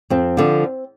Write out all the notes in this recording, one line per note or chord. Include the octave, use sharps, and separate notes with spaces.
F2 C4
D3 F3